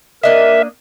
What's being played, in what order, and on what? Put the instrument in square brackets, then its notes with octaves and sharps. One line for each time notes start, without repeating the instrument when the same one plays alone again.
[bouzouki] A#3 D4 D#5 [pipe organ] A#4 [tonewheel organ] E5